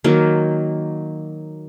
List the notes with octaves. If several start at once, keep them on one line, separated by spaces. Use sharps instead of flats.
D#3 F#3 A#3